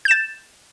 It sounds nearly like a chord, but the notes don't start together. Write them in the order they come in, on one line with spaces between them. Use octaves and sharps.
G6 E7 A6